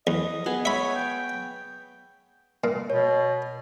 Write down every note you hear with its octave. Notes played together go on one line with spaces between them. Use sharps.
E2 D#5
B3 G#4 B4
C#5 E5 B5
G5
A#2
B2 C#5